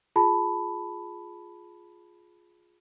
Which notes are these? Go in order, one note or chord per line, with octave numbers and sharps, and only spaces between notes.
F4 G#4 A5 B5